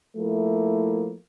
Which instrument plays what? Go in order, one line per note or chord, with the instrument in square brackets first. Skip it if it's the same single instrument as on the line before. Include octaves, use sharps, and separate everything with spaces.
[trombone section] F3 A3 A#3 E4